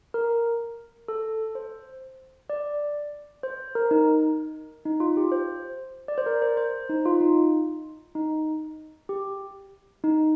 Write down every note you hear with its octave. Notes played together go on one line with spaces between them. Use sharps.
A#4
A4
C5
D5
C5
A#4
D#4
D#4
F4
G4
C5
D5
C5
A#4
C5
C5
D#4
F4
D#4
D#4
G4
D#4